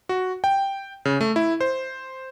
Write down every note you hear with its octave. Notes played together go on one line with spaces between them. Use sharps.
F#4
G5
C#3
A3
E4
C5